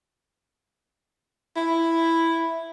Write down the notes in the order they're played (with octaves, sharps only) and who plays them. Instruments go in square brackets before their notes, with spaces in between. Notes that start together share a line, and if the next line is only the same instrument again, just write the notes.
[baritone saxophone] E4